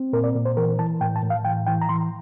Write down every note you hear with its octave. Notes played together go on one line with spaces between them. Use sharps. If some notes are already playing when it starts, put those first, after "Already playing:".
Already playing: C4
A#2 A#4
D5
A#2
C5
E3 A#4
E3 A5
A2 G5
A5
A2
F5
E3 G5
E3 G5
A#5
E3 C6